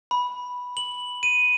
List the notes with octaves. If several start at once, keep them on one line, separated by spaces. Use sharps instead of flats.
B5
F#7
D#7